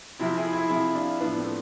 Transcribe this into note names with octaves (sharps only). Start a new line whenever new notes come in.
C3 F3 C4 E4
E4 G#4
E4 G#4
C3 F3 E4 G#4
D4 F4
A2 F3 B3 D4
A3 C4